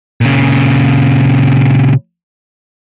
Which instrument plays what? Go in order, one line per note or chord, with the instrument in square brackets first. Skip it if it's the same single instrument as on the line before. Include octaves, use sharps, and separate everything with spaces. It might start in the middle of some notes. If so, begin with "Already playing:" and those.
[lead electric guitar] A#2 C#3